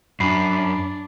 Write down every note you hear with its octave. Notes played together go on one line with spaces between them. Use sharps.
F#2 D4 B5 C7